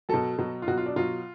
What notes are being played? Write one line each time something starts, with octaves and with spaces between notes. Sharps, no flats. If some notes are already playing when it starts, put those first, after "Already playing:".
B2 F#3 A4
B2 F#3
F4
B2 F#3 F#4
F4
D4
B2 F#3 F4